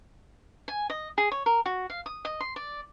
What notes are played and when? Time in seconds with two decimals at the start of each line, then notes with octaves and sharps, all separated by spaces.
0.68 G#5
0.90 D#5
1.18 G#4
1.31 C#5
1.46 A#4
1.66 F#4
1.90 F5
2.06 D#6
2.25 D#5
2.40 C6
2.56 D5